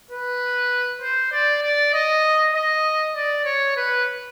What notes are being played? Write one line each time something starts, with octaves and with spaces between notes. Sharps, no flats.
B4
C5
D5
D5
D#5
D#5
D5
C#5
B4